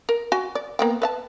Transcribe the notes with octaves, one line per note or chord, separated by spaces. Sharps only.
A#4
F#4 G#5
D5
A#3 B3 G5
B4 E5 A5